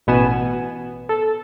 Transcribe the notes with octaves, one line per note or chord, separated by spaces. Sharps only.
A1 B2 B3 G#5 E7
A4